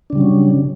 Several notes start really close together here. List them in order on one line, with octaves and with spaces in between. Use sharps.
D4 C#3 G3 F#3 C#4